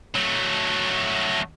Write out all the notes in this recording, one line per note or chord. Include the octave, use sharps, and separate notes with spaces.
F#3 A3